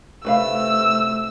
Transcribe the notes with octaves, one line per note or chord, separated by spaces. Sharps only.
C3 A3 F#4 B4 F5 E6